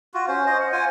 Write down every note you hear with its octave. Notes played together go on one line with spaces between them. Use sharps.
F4 F#4
C#4 C5
C5 D#5
F#5
F4 C5 G#5